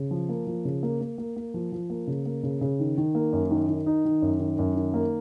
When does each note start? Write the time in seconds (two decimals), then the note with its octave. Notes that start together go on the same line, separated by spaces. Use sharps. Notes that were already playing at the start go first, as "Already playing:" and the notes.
Already playing: C#3
0.11 F3
0.29 A#3
0.47 F3
0.65 C#3
0.83 A#3
1.01 A#3
1.18 A#3
1.36 A#3
1.54 F3
1.72 F3
1.90 A#3
2.07 C#3
2.26 A#3
2.43 C#3
2.61 C#3
2.80 D#3
2.98 D#3
3.15 A#3
3.33 F#2
3.51 D#3
3.69 D#3
3.86 D#4
4.05 D#3
4.22 F#2
4.40 D#3
4.58 F#2
4.76 D#3
4.94 A#3